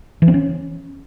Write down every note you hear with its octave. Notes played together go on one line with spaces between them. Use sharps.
E3
C4
C#4